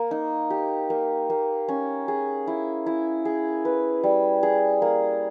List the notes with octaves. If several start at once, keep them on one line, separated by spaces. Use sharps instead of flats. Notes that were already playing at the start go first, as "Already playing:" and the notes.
Already playing: A#3
D#4
G4
A#3
A#3
C#4
G#4
E4
E4
G#4
B4
G3
G#4
A#3